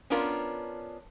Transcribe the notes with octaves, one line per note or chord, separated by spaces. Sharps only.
B3 C#4 D4 F4 A#4